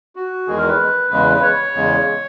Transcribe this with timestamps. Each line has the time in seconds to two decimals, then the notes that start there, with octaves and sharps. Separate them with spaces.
0.16 F#4
0.47 E2 D#3 G#3 G#4
0.58 A#4
0.68 B4
1.11 E2 C#3 G#3 B4
1.34 B4
1.42 C#5
1.74 E2 C#3 G#3